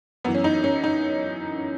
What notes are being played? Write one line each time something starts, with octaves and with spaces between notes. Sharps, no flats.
F#2 E3 B3
C#4
D#4
C#4
D#4